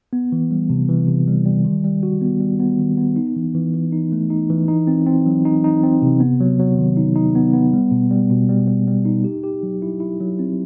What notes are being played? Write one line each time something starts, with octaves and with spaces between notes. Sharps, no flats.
B3
E3
G3
C3
E3
C3
G3
G3
D#3
G3
F#4
B3
G3
B3
D#3
B3
D#4
E3
E3
E3
D#4
A3
D#4
E3
D#4
C4
C4
F#3
D#4
D#4
C4
C3
B3
F#3
F#3
D#3
D#4
D#4
B3
B3
G3
B2
G3
B2
G3
G3
G3
D#4
G4
G4
F#3
E4
E4
F#3
C4